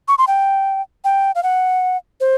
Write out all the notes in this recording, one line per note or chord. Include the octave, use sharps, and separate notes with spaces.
C#6
C6
G5
G5
F5
F#5
C5